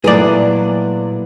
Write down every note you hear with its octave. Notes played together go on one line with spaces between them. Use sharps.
A#2 F#3 A3 E4 G#4 B4 D5